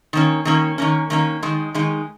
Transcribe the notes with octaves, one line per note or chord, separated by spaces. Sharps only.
D#3 A#3 C#4
D#3 A#3 C#4
D#3 A#3 C#4
D#3 A#3 C#4
D#3 G#3 D#4
D#3 G#3 D#4